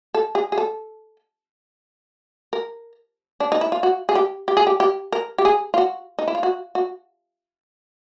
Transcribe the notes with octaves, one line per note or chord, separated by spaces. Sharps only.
A4
G#4
G#4
A4
A#4
D4
D#4
E4
F4
F#4
G#4
G4
G4
G#4
G4
G4
A#4
G4
G#4
F4
F#4
D#4
E4
F4
F#4
F#4